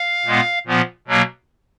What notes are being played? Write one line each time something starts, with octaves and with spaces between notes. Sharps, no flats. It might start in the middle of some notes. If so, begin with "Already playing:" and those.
Already playing: F5
A#2 G#3 B3
A#2 F3 B3
B2 F#3 A#3